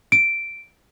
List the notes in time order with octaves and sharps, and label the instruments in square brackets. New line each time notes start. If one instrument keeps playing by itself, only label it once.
[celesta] D7